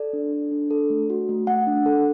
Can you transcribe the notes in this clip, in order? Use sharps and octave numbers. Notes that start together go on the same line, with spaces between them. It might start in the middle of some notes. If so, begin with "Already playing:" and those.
Already playing: A4 D5
D4
A4
D4
A4
A3
F#4
A3
A3 F#5
D4
A4